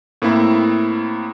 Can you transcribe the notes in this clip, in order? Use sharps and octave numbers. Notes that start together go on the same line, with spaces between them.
A2 A#3 C4 E4